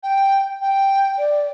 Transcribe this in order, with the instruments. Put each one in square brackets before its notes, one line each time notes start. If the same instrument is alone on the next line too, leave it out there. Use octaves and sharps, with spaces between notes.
[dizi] G5
G5
[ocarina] D5